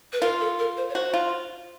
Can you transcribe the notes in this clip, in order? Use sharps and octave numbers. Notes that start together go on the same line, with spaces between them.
B4
F4 A#4
A4
A#4
C5
C#5
F#4 C5
F4